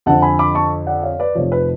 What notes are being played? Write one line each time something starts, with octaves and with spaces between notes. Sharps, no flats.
F2 D3 F3 F#5 A5
G#5 B5
B5 D6
A5 C#6
D5 F#5
C#5 F5
B4 D5
F1 F2 F3 C#5
B4